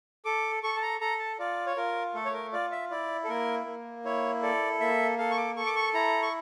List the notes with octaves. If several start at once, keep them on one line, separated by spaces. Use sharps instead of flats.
A4 D6
A4 C#6
A5
A#5
A4 A#5
A5
F4 D5
C#5
F4 A#4
A3 A4
C#5
A#4
F4 D5
E5
E4 D5
A4
A#3 A#4
A#3
E4 C#5
A4 D5
A#3 E5
A4 F5
C#6
D6
A4 C#6
D6
C#6
E4 A#5
C#6